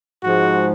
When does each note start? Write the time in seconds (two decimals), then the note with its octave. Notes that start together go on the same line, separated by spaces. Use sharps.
0.23 G#2 F3 G#3 F#4